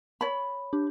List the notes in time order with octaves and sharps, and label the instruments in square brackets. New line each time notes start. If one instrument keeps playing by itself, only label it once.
[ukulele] C#5 B5
[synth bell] D4 G4